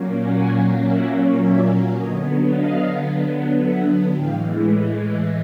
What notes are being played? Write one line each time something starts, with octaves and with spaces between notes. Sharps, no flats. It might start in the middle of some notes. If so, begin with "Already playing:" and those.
Already playing: A#2 F#3 A#3 C#4
F#5 G#5
E5 F#5
D5 E5
D3 F#3 B3 C#5 D#5
D#5 F5
E5 F#5
A2 E3 G#3 F5 G5